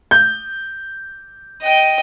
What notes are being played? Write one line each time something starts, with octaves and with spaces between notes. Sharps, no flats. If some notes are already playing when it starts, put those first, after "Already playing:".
G6
D#5 G5